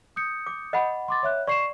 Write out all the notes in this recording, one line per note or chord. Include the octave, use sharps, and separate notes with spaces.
D#6 G6 C#7
D6
D#5 F#5 B5
C6 D6 A6
C#5 E5 F#6
D5 C6 C#6 C7 E7